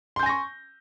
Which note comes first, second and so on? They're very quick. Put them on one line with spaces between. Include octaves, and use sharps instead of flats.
C6 G6 G#5 A#6 C#6